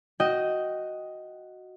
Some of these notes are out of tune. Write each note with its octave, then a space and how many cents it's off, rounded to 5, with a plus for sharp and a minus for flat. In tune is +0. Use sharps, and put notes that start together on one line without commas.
F#4 +0 D#5 +5 G5 -10